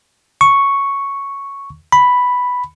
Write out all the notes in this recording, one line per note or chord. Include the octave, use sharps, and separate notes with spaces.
C#6
B5